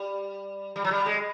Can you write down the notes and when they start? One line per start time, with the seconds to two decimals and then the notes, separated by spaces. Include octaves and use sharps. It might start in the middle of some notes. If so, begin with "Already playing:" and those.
Already playing: G3
0.76 G3
0.84 F#3
0.91 G3
1.06 G#3